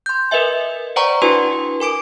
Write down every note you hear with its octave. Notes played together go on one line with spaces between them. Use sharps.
C6 G6
A#4 B4 D#5 E5 G#5
C5 D5 F#5 G5 A#5 C#6
D4 E4 F#4 B4 G#5 C6
A#4 G#5 D6 D7